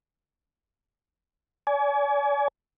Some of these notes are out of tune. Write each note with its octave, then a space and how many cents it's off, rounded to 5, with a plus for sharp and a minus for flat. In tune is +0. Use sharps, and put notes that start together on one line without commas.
D5 -45 G#5 +25